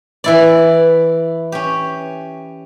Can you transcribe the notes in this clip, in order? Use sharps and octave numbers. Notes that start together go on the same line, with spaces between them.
E3 E4 D5
C#4 G4